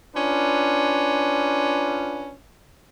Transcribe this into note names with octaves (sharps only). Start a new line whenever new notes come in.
C#4 D4 F4 B4